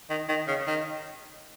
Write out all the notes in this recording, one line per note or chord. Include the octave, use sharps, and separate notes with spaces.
D#3
D#3
C#3
D#3